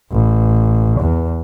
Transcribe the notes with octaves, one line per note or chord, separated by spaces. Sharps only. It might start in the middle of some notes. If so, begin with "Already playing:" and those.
A1
E2